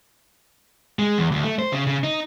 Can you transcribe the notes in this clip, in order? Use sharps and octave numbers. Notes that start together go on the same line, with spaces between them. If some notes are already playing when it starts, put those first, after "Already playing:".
G#3
E2
D2
A3
C5
C#3
C#3
D#4